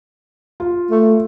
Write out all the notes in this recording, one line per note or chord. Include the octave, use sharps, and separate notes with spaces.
F4
A3